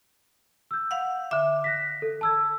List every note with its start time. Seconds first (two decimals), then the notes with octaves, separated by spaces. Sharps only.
0.71 E6 G6
0.91 F5 F#5
1.31 D3 E5 D6
1.64 F#6 A#6 B6
2.02 A4
2.21 A5 E6 G#6